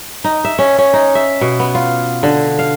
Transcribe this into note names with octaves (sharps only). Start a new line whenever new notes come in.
D#4
E5
C#4
C#4
D#4
E5
B2
B3
F4
D3
F5